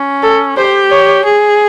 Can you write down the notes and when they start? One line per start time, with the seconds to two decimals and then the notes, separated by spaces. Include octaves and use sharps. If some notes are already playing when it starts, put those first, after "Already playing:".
Already playing: C#4
0.23 A4
0.57 G4 C5
0.91 C#5
1.25 G#4